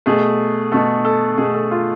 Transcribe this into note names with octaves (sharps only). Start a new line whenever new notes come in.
B2 A3 G#4
B2 A3 A4
A4
B2 A3 G#4
A4
F4